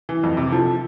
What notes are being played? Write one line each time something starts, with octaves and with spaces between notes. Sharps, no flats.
E3
F2
C3
F3 A4